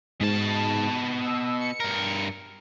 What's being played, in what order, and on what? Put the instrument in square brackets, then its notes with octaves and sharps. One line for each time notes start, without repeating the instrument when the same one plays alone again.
[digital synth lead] G#2 [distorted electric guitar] B2 A5
[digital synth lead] E6
C#7
[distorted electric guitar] G2 A#4